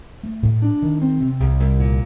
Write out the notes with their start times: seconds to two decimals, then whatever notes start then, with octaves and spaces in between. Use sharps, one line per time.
0.23 A3
0.42 A2
0.62 D4
0.82 D#3
1.02 C4
1.20 C3
1.40 C2
1.60 C2
1.80 A#2